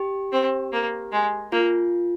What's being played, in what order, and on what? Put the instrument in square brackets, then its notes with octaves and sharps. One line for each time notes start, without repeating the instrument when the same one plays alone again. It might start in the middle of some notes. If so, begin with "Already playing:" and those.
Already playing: [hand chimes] G4
[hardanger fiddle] C4
A#3
G#3
[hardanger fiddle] A#3 [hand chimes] F4